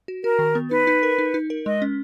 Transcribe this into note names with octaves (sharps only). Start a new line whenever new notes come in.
F#4
F#4 A#4
D#3
B3
D#4 B4
D#4
A#4
D#4
D#4
A#4
G#3 D#5
C#4